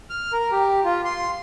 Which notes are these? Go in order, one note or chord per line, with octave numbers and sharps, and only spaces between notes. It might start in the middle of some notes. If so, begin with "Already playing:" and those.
F6
A#4
G4
F4
C6